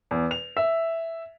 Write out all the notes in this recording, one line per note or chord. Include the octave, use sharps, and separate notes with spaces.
E2
F7
E5